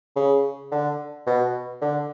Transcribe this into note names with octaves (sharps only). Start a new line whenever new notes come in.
C#3
D3
B2
D3